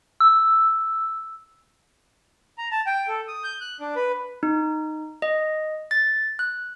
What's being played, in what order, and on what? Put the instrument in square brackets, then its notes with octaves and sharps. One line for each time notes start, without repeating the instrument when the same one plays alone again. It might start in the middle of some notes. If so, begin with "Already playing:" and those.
[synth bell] E6
[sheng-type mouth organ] A#5
A5
G5
A4
D#6
G6
F#6
D4
B4
[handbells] D#4
D#5
A6
F#6